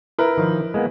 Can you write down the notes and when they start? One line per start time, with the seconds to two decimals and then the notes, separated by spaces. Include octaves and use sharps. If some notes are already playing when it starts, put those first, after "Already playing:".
0.18 E4 A#4 B4
0.37 D#3 F3
0.74 G#3 A#3 B3